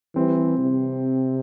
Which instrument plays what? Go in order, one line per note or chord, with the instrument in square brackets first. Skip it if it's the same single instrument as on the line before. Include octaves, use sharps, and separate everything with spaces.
[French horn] E3 [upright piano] G3 C4
[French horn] C3